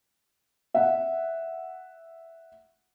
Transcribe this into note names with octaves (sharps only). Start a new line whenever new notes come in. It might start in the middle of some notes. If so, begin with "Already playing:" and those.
E5 F#5